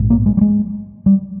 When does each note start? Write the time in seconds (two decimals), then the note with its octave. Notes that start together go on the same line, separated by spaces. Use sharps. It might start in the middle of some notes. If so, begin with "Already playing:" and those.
Already playing: A#1 G#2
0.10 A#3
0.26 G#3
0.37 G3
0.41 G#3
1.06 G3